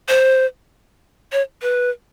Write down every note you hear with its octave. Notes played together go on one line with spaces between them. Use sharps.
C5
C#5
B4